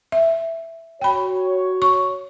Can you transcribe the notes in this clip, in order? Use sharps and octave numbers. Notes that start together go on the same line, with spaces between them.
E5
F#4 C#5 G5 B5
C#6